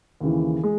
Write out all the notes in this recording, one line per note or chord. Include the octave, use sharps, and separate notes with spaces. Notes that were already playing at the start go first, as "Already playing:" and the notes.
D#2 C#3 E3
G#3